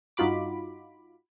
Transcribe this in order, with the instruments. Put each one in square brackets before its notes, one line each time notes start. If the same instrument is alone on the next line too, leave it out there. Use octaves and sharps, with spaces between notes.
[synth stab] G2 D#4 F4 F#4 B5 D6